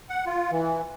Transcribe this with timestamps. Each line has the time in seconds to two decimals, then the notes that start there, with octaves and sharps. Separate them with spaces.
0.09 F#5
0.26 F4
0.51 E3